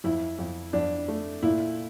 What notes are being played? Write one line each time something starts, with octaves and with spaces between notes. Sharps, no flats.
F2 E4
F2
F2 D4
A3
A#2 E4